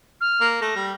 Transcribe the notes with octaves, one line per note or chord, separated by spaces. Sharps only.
F6
A#3
A3 A#6
G3